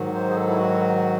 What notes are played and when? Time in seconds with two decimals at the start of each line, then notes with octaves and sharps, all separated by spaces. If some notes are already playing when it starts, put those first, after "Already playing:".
Already playing: G#2 D#3 F#3
0.14 C5
0.30 G#4
0.35 A4
0.48 E4
0.57 F#4